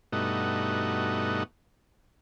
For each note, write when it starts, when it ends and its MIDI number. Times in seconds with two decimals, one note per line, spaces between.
0.12 1.43 43
0.12 1.43 47
0.12 1.43 57
0.12 1.43 63
0.12 1.43 66